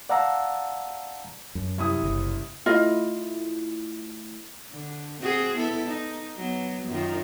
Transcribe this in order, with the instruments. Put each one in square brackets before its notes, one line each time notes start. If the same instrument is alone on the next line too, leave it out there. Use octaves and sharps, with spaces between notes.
[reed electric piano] D5 F5 F#5 A5 A#5 E6
[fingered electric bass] F#2
[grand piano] C2 E4 D#6
[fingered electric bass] F#1
[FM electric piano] A3 E4 [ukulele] F4 D#5
[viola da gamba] D3
C4 F#4 G#4
B3 E4 A4
D#4
F#3 B3
F#2 D#3 F4